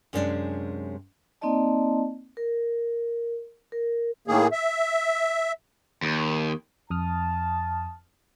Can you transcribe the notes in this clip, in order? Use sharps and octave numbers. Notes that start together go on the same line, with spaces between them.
F#2 C3 G#3 B3 C#4 D4
A#3 C4 D#4 D5 D#5 A5
A#4
A#4
A2 D#3 A#3 G#4
E5
D#2
F2 A5 D#6 F6